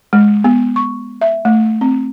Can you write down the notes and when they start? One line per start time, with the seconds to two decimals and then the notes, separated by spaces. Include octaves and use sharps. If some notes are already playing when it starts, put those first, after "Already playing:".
0.13 G#3
0.44 B3
0.76 C#6
1.21 E5
1.45 A3
1.81 C4